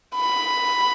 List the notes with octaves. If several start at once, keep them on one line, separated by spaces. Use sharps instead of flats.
B5